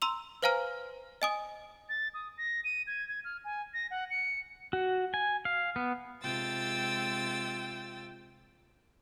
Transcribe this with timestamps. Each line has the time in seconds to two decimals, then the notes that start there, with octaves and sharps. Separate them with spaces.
0.02 A#5 C6 E6 F7
0.43 B4 C5 F5 G#5 A#5 F6
1.22 D#5 G#5 D#6
1.89 A6
2.14 D#6
2.38 A#6
2.64 D#7
2.87 G#6
3.08 G#6
3.25 F6
3.45 G#5
3.74 A#6
3.91 F#5
4.10 C#7
4.73 F#4
5.14 G#5
5.45 F5
5.76 B3
6.21 C3 G#3 F4 G5 E6 A6